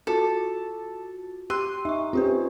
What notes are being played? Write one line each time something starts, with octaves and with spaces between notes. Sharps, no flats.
F4 F#4 A4 A6
G4 C6 E6 F#6 D#7
D#4 E5 C#6
C4 C#4 F4 G4 B4